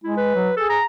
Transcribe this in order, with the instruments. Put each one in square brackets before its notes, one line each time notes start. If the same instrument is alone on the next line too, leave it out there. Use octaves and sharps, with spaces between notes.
[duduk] G#3 [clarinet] E4
[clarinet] B4
[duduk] F#3
[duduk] G#4 [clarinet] A4
[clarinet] A#5